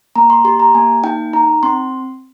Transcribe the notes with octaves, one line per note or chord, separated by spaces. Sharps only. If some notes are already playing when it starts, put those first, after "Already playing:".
A#3 A#5
C6
G4 C6
A#5
A#3 G#5
D#4 G5
D#4 A#5
C4 C6